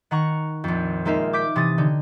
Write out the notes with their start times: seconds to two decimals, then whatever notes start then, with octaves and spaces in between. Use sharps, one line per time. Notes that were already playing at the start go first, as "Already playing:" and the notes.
0.11 D#3 F#5 A#5 C#6
0.64 A#1 F2
1.05 G#3 A#3 D#4 E5 F5
1.33 D6 G6 B6 D7
1.56 C3 E3 D#6 A6
1.78 D3 D#4